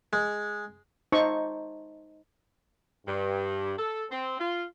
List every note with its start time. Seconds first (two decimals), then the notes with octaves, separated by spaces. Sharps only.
0.13 G#3
1.12 D#4 C5 A5 C#6
3.07 G2
3.78 A4
4.10 C4
4.40 F4